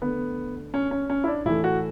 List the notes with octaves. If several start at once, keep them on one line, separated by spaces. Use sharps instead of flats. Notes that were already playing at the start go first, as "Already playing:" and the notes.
D3 A3 B3
C#4
C#4
C#4
E4
D4
A2 E3 A3 E4
F#4